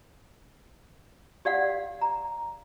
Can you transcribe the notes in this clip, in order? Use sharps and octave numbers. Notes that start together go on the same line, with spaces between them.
G4 D5 F5 F#5
A#5